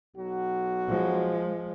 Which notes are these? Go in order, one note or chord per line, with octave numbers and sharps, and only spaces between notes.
B1 F#3 F#4
F3 G#3